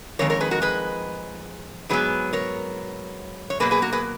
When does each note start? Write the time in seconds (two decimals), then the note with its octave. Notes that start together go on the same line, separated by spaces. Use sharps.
0.19 F2 D#3 G#3 A#4 C#5
0.30 A#4 C#5
0.40 G#4 B4
0.51 F#4 A#4
0.62 G#4 B4
1.89 G#2 F#3 B3 G#4 B4
2.33 A#4 C#5
3.50 C#5
3.60 B2 F#3 A#3 G#4 B4
3.71 G#4 B4
3.82 F#4 A#4
3.92 G#4 B4